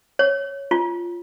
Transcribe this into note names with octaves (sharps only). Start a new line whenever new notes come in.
C#5
F4